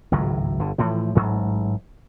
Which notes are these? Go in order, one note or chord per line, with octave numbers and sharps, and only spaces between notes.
G#1 C#2 A2 F#3
G1 D3
A2 E3 F3
A1 G#2 F#3